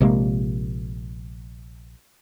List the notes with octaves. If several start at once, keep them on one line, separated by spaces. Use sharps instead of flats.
A#1 C3 G#3 A#3